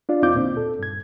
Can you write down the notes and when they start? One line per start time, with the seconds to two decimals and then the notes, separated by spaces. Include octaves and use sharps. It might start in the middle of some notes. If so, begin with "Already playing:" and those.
0.09 D4 F4 D5
0.23 E2 C4 D#4 F4 D6 G6
0.34 D2 A#2 C4
0.57 A4
0.79 G2 G#6